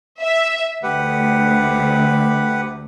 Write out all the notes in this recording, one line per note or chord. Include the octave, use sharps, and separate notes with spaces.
E5
D2 G4 B4 F#5